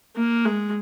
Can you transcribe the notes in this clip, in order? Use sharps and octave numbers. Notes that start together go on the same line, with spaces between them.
A#3
G#3